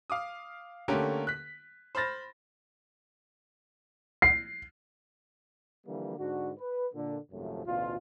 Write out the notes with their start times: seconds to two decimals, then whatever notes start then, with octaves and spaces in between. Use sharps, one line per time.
0.10 F5 D6 D#6
0.88 D3 A3 A#3 C#4 G4 A#4
1.27 F#6 B6
1.95 C5 B5 F6 A6 A#6
4.22 C7
5.87 D3 E3 F3 G3 A#3
6.18 G#2 D3 D4 F#4
6.58 B4
6.93 A#2 D3
7.31 G#1 F#2 C3 F3 A3
7.66 A1 D2 B2 F4